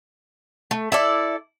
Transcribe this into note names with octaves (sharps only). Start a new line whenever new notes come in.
A3
E4 A4 D5